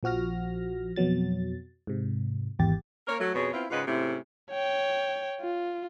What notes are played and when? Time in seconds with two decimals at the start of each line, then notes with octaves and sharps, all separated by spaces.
0.03 A#1 F3 F#4 F6 A#6
0.96 F2 B2 F#3 A6
1.87 G#2 C3
2.59 G#1 E2 G4 A6
3.07 A#3 A#4 C#5
3.20 F#3 A3
3.34 F2 B2 G#4 C#5
3.53 B3 C4 E4 F4
3.70 G#2 C#3 F4 B4 D#5 F#5
3.87 G#2 C3 A3 C#4 E4
4.51 C#5 G5
5.40 F4